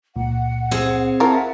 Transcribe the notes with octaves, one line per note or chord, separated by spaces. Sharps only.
C#2 A#2 F#5
C4 G#4 F5
E4 F4 A#4 E5 F#5 A5